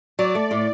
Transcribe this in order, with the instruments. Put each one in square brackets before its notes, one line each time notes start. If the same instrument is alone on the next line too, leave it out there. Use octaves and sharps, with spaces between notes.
[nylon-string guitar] F#3 [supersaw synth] D5
[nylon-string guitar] A3
A2